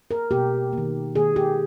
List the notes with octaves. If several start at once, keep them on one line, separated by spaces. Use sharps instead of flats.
A#4
B2 A#3 G4
D#3 A#3
D#3 A#3 G#4
G4